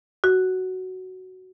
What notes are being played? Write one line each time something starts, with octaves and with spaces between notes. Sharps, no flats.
F#4